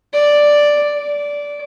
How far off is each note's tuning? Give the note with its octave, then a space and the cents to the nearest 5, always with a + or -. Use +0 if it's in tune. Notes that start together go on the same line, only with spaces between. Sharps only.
D5 +0
D5 -15